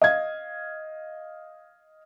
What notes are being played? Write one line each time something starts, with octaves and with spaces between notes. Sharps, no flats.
D#5 F5 G#6